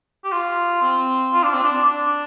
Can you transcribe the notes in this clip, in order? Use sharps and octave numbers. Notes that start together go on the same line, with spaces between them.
G4
F4
C4
F4
D4
C4
D4
D4